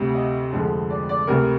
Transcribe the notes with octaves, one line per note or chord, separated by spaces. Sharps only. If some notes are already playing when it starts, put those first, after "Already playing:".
Already playing: D2 C3 G3
D#5
F2 D3 F3 G#3
D5
D5
D2 C3 G3 A#4